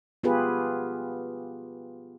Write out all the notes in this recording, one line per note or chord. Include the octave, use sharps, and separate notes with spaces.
B3 F4 G4 G#4 B4